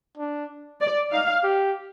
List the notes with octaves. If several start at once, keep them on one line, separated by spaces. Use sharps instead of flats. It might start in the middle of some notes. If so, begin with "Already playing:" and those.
D4
D5
D#4 F5
G4